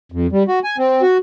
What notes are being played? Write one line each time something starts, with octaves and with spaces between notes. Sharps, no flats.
F2
G3
F#4
G#5
C4
F#4